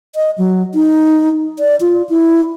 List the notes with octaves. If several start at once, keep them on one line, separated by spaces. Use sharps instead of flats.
D#5
F#3
D#4
D5
F4
E4